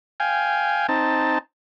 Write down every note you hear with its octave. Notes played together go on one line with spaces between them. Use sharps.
F5 G5 G#5
C4 D#4 A5